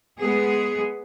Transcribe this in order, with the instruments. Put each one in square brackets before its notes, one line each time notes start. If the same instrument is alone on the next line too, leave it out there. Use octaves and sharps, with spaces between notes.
[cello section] G#3 B3 G#4